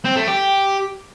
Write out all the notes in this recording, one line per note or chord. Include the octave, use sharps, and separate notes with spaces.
C4
A3
G4